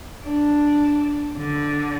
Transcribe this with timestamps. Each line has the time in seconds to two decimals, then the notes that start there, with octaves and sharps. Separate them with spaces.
0.23 D4
1.37 D3